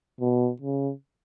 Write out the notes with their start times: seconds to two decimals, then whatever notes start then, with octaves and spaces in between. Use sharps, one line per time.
0.21 B2
0.62 C#3